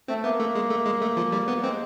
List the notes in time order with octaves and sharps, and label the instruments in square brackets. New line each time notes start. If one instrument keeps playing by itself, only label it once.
[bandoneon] A3 [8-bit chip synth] C4
[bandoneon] A#3 [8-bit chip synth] B3
[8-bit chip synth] A3
G#3
A3
G#3
A3
F3
G3
B3
[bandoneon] G#3 [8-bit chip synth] C4